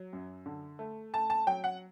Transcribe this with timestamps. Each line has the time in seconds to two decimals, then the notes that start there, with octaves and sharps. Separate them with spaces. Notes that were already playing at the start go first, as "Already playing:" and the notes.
Already playing: F#3
0.13 F#2
0.46 D3
0.79 A3
1.14 A3 A5
1.30 A5
1.47 F#3 G5
1.64 F#5